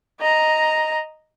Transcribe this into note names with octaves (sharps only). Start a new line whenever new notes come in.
D#5 A#5